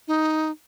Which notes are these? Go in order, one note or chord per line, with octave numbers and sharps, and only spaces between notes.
D#4